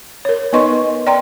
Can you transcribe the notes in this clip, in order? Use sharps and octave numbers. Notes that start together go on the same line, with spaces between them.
A#4 C#5
B3 D#4 B4 D#5 C6 C#6
D5 G5 A#5 C6